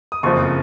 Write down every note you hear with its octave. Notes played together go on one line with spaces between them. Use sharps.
D#6
F#1 F2 F3 C#6